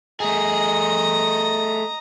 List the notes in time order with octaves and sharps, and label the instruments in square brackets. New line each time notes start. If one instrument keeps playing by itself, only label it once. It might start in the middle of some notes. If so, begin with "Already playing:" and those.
[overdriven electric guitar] A3 G#4 [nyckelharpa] D#5 A#5